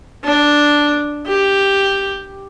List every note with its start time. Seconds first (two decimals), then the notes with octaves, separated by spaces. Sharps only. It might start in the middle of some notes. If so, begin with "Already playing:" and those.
0.24 D4
1.26 G4